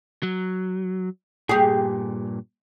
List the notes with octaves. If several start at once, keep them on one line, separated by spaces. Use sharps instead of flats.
F#3
G2 A#2 G4 G#4